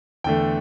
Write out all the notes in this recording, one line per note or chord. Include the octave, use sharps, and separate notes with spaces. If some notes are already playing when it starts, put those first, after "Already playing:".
E2 D3 A3 G5